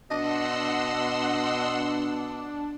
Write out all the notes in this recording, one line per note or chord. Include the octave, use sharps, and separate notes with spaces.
B2 D4 D#5 F#5 C6 E6